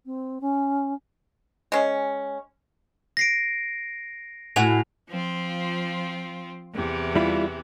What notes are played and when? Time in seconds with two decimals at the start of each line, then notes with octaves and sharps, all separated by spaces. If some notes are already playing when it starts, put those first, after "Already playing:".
0.06 C4
0.41 C#4
1.72 G#3 C#4
3.17 A#6 C7 D7
4.56 A2 E4 F#4 G#5 F7
5.09 F3 C4 F4
6.74 E2 C3 E3
7.15 G3 E4 F4